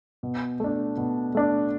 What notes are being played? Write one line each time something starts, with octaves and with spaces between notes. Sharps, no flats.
B2
A3 D4
B2
A3 D4